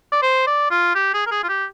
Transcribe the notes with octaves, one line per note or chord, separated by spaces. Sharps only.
D5
C5
D5
F4
G4
G#4
A#4
G#4
F4
G4